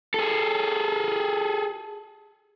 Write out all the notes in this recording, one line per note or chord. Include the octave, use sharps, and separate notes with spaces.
G#4 A4